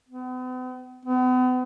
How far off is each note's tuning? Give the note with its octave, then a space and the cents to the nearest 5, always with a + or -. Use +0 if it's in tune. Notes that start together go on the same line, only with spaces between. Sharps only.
B3 +45
B3 +40